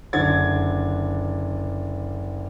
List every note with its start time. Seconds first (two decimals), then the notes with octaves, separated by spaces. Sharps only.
0.13 F#1 D3 D4 G#6 A6